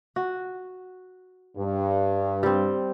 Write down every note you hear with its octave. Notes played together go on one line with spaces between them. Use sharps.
F#4
G2
G3 C4